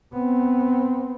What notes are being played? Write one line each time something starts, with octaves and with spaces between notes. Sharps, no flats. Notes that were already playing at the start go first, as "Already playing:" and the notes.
B3 C4